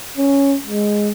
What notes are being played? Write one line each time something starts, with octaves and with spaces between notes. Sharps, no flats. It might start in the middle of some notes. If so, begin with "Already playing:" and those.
C#4
G#3